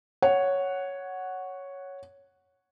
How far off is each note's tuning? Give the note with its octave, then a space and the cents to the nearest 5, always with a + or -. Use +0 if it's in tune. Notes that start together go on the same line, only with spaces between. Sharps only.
C#5 +0 F#5 +0